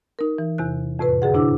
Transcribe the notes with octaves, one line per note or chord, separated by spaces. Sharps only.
D#4 A#4
E3
E2 C3 F#6
F2 A2 C3 B4
F#2 D3 G#4 F#5
C3 D4 E4 D6 E6